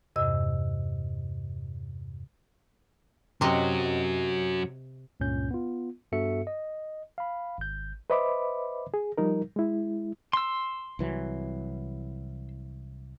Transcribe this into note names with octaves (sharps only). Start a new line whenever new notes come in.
E2 G2 C3 D#5 E6
F#2 C3 F#3 D#5
C#2 G2 A#2 C#4 G6
B3 F4
G2 B3 F#4 A4 E5 C#7
D#5
F5 B5
G#1 G6
B4 C5 D#5 E5 B5 D6
G#4
F3 G3 D#4 A#4
G#3 E4
C6 E6
C2 E3 F#3